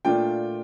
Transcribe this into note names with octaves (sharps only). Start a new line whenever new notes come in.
A#2 A3 D4 F4 G5